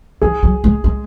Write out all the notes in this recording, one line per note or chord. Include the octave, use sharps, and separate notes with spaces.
E3 G#4
F#3
G#3
G#3